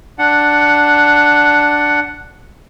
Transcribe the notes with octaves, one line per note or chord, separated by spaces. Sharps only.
D4 F#5